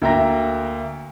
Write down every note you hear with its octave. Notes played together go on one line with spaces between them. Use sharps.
D2 A#3 E5 G5 A#5 A#6